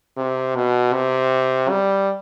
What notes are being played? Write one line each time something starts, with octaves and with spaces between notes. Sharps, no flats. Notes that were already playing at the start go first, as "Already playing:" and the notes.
C3
B2
C3
G3